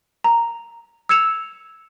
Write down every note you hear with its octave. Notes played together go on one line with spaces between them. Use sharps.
A#5
E6 G#6 C#7 E7 F7